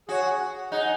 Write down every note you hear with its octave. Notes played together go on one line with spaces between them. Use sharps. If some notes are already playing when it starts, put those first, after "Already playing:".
F#4 G#4 C#5 F#5
D#4 G#4 F#5